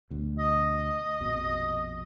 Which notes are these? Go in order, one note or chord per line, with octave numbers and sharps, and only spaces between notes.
D2 B2
D#5
A#1 F2 B2